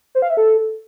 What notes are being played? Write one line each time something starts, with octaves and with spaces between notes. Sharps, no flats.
C5
F5
E5
A4